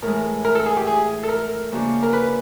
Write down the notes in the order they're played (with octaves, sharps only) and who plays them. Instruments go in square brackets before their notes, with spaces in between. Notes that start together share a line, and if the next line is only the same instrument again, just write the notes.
[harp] A2 E3 G#3 [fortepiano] A#4
[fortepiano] A#4
A4
G#4
G4
G#4
A4
A#4
[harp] C#3 F3 A#3 D4 F#4
[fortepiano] A#4
B4